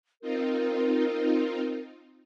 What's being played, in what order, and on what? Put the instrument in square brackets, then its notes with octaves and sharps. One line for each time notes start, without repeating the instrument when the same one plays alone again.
[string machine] C4 D#4 F4 [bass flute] A#4